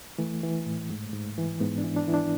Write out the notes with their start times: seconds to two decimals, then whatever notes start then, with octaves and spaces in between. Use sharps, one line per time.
0.18 E3 A3
0.43 E3
0.66 A2
0.90 G#2
1.13 G#2
1.38 E3
1.60 G#2 B3
1.78 D4
1.84 E3
1.96 D4
2.07 E3 E4
2.14 D4